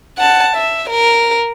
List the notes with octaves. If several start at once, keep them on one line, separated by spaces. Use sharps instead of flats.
F#5 A5
E5
A#4